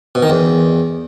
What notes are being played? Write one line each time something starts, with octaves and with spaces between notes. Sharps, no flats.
B2
D#3
E2